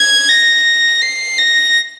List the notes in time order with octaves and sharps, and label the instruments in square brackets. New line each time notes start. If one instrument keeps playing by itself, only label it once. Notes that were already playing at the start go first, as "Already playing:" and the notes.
Already playing: [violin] G#6
A#6
C7
A#6